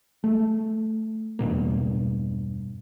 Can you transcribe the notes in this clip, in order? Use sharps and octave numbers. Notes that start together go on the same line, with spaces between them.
A3
E2 G2 B2 A#3